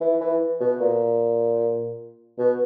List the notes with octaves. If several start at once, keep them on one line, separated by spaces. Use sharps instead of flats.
E3
E3
B2
A#2
B2